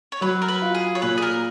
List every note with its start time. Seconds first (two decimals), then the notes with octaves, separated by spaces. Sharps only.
0.12 C#5
0.21 F#3 B4
0.42 A#4
0.48 B4
0.62 F4
0.75 G#4
0.95 C#5
1.02 A#2 B4
1.18 G#4
1.22 A#4